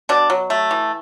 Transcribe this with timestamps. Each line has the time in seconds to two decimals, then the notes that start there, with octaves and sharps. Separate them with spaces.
0.09 B2 D4
0.30 F#3
0.50 A3
0.71 E3